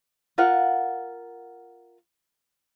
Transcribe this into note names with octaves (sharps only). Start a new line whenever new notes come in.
F4 A#4 F5 F#5